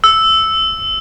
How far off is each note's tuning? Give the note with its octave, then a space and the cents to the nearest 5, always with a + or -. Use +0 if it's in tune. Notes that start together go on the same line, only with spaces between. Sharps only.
E6 -5